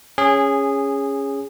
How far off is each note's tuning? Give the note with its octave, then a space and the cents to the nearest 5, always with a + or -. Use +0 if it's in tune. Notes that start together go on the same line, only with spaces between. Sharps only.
C#4 +0 G#4 -15